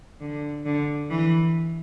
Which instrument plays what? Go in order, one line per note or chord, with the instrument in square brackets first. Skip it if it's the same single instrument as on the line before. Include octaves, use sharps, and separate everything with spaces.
[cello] D3
D3
E3